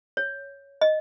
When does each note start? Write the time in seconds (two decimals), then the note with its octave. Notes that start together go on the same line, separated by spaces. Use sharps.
0.17 C#5
0.81 D#5